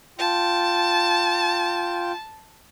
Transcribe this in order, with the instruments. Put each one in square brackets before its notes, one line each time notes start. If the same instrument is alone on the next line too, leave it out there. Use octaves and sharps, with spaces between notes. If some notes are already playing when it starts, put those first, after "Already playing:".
[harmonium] F4 G5 [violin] A5